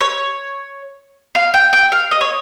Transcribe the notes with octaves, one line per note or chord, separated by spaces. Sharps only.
C#5
F5
G5
G5
F5
D#5
C#5